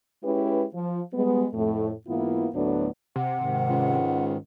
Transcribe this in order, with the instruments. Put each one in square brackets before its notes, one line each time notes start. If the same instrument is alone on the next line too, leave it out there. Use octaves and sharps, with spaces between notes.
[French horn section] G#3 C#4 E4 G4 B4
F3
G3 G#3 B3
F2 A2 A3
G#2 E3 A#3 B3 E4 F4
D2 A2 F#3 A3 B3 D4
[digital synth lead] C3 [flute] F#5
[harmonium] G#2 D#3
[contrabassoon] C#2